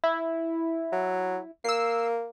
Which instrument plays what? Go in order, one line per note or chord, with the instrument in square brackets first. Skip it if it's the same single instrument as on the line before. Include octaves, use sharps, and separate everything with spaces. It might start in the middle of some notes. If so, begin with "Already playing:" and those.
[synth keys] E4
[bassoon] F#3
[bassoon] A#3 [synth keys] E6 C7